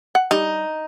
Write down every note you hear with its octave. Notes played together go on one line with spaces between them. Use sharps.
F#5
G3 D#4